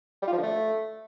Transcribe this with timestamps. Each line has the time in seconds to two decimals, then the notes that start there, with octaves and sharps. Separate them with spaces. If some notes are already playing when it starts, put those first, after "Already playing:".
0.22 G3
0.27 F4
0.32 F3
0.38 D3
0.43 A3